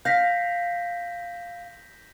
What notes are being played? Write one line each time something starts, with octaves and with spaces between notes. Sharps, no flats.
F5 G6 A#6 B6